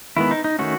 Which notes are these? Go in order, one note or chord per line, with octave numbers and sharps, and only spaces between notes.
D#3 G#3 B3 E4
D#4
D#4
D#3 A3 C#4 F#4